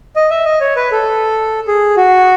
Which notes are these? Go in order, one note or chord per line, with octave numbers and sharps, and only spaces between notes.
D#5
E5
D#5
C#5
B4
A4
G#4
F#4